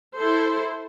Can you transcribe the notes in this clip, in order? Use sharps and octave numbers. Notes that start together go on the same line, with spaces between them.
E4 A4 C5